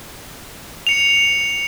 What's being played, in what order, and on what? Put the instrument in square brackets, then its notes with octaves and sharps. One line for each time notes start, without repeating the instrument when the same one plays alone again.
[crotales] C#7 F7